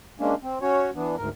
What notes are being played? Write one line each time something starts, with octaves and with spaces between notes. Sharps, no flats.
G#3 A#3 C#4 D4
C4
C#4 F#4 C#5
E3 B3 D4
D2 G#2 A#4